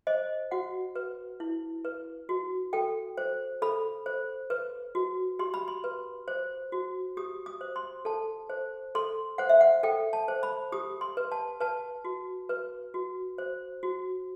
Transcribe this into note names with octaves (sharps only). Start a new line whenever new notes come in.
C5 D#5
F#4 F#5
B4
E4
B4
F#4
A4 G5
C5
A4 B5
C5
B4
F#4
G4 C6
B5
C6
B4
C5
F#4
G4 D#6
D#6
C5
C6
A4 A5
C5
A4 C6
C5 F#5
E5
F#5
A4 G5
A5
C5
B5
G4 D#6
C6
B4
A5
B4 A5
F#4
B4
F#4
C5
F#4